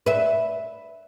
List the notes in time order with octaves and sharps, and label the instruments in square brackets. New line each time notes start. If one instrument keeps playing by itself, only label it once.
[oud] B4 E5